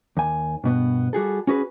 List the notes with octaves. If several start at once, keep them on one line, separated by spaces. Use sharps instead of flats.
D#2 G#5
G2 B2 B3
G3 F#4 G#4 A4
C#4 F#4 G#4 B4